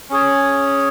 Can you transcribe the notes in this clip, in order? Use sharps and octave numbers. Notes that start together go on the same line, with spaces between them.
C#4 G#4 C#5